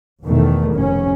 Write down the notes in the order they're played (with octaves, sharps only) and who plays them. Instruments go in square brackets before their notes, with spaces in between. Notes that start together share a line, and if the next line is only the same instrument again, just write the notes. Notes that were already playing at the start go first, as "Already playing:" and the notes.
[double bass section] E2 B2 D#3 A3
F1 C#4